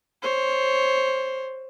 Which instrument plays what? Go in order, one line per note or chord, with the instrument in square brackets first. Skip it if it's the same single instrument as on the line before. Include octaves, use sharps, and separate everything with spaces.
[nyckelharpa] C5 C#5